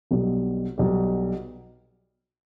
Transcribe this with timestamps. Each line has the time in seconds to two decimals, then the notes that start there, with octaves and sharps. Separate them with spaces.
0.11 B1 B2 G3
0.78 B1 B2 G3